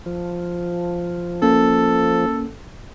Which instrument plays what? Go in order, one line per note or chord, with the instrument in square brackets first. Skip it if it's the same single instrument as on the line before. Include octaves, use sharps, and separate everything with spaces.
[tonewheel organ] F3
[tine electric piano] A#3 C#4 [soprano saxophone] A4